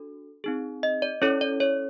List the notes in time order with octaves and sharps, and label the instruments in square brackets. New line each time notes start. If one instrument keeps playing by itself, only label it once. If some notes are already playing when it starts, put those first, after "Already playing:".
Already playing: [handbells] D4 F#4 A4
C4 D#4 G#4
D#5
D5
C#4 E4 A4 C#5
D5
C#5